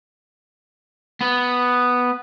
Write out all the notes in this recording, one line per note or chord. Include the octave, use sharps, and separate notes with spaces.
B3